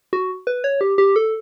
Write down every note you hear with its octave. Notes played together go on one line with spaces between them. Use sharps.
F#4
B4
C#5
G4
G4
A4